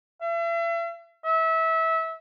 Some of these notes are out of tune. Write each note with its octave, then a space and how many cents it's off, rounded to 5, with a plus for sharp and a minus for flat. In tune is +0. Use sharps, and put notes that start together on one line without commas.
E5 +40
E5 -25